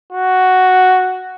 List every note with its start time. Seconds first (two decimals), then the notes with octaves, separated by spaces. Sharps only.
0.12 F#4